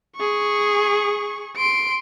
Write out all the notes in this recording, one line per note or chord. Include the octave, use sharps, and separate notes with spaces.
G#4 C#6
C6 D7